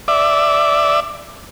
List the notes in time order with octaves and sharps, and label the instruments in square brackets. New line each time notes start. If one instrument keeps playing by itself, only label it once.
[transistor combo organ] D5 E5